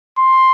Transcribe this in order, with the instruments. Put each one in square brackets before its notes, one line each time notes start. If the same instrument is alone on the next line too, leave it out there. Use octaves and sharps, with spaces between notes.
[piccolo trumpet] C6